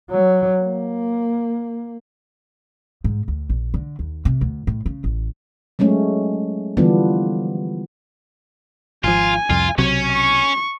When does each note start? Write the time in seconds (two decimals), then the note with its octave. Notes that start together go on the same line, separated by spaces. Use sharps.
0.11 F#3
0.61 A#3
3.04 G#2
3.28 D2
3.49 A#1
3.74 D3
3.99 D#2
4.25 C3
4.41 D2
4.67 A2
4.86 C#3
5.04 A1
5.79 F#3 G#3 A3 C#4
6.77 D3 E3 F3 G3 B3 D4
9.04 G#1 F3 F4 G#5
9.50 C2 F2 F4
9.78 B1 C3 F#3 C#4 C#5
10.13 C#6